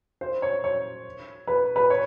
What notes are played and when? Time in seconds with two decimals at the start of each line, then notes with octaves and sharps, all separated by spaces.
0.21 C5
0.42 C#5
0.64 C#5
1.47 B4
1.76 B4
1.90 C#5